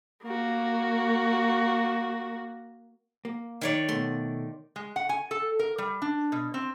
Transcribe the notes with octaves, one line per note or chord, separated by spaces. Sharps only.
A#3 F#4
A#3
D#3 C#5 D5
B2 A3 C6
G#3
F#5
G#5
A4
A#4
G3
D4
B2
C4